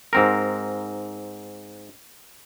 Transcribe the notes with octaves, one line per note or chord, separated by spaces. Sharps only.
G#2 C4 A#4